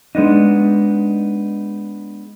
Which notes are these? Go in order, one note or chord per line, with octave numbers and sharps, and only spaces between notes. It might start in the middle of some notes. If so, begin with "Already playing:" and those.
G#3 B3 D4 D#4